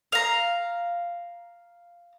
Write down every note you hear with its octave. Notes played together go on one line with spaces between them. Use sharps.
F5 A#5